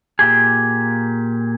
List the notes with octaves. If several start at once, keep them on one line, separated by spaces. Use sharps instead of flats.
A#2 G4 G#4